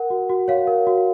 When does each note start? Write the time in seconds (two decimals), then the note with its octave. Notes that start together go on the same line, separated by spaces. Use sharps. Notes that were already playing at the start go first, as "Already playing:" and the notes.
Already playing: A#4 F#5
0.10 F#4
0.30 F#4
0.48 C#5 F5
0.67 A#4
0.87 F#4